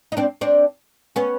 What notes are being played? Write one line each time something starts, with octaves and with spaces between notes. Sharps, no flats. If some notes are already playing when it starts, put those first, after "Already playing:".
D#4
C4 D4
C4 D4
B3 C#4